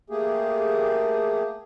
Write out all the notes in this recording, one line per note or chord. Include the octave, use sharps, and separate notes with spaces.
A3 A#3 G4 G#4